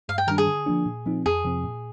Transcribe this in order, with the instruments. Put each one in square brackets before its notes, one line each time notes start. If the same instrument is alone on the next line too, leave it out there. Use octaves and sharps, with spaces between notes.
[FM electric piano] G2 [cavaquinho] F5
[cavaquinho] G5
[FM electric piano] D#3 G3 D4 [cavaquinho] A#4
[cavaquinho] G#4
[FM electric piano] D3
F3 A#3 D4
A#2
F3 C4 D#4
[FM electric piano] F2 [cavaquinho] G#4
[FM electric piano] C3 F3 C4
A#2